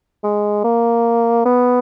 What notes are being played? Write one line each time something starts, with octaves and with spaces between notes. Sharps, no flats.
G#3
A#3
B3